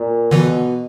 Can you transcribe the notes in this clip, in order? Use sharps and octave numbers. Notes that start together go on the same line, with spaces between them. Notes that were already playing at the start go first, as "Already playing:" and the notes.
Already playing: A#2
B2 D3 E3